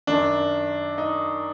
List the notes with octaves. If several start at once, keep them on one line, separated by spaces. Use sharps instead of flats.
F#2 D#3 D4
D#4